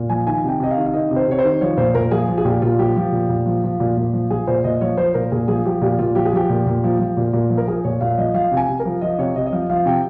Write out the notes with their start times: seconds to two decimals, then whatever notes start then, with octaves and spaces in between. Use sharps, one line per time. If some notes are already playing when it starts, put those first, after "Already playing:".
Already playing: A#2
0.10 F3 G#5
0.26 D#3 G#5
0.44 C3 G5
0.60 C3 D#5
0.71 F5
0.77 D#3
0.86 F5
0.93 D#3 D#5
1.11 C3
1.16 C5
1.27 C3 C#5
1.39 C5
1.44 D#3
1.61 F3 C#5
1.77 A#2 C5
1.94 A#2 A#4
2.11 F3 G#4
2.29 F3
2.38 G#4
2.45 A#2 G4
2.62 A#2 F4
2.79 F3 G4
2.96 F3
3.12 A#2
3.29 A#2
3.46 F3
3.64 F3
3.80 A#2
3.97 A#2
4.13 F3
4.30 F3 G#4
4.47 A#2 C5
4.64 A#2 D#5
4.81 F3 C#5
4.97 F3 C5
5.14 A#2 A#4
5.32 A#2 G#4
5.48 F3 G#4
5.66 F3 G4
5.82 A#2 G4
5.99 A#2 F4
6.15 F3 G4
6.25 G#4
6.33 F3 G4
6.50 A#2
6.66 A#2
6.84 F3
6.99 F3
7.17 A#2
7.33 A#2
7.50 F3
7.57 A#4
7.67 F3 G#4
7.84 A#2 C#5
8.01 A#2 F5
8.18 F3 D#5
8.34 F3 F5
8.52 C3
8.57 G#5
8.69 C3
8.80 A#4
8.85 F3
9.01 F3 D#5
9.19 C3 C#5
9.36 C3 D#5
9.47 D#5
9.53 F3 F5
9.70 F3 F5
9.86 C3 G5